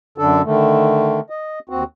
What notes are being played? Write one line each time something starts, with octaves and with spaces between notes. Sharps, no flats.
F#2 D3 D4 A4
D3 D#3 A3
D#5
D#2 C4 F#4